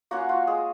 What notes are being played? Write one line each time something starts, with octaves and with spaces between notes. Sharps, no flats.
A#3 C#4 F4 F#4 F#5
F4 F5
G#3 G#4